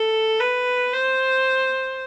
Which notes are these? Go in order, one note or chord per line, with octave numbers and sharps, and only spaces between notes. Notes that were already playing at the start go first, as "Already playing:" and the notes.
Already playing: A4
B4
C5